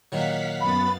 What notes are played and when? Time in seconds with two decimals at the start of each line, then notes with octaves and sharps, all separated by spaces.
0.12 A#2 D#3 F#3 F5 F#5 B6
0.61 F#2 B3 B5 A6